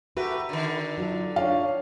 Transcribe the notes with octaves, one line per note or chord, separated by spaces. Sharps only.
A3 F#4 G4 A#4 B4
D3 D#3
F#3 F4 A4
D4 F4 A4 C#5 F5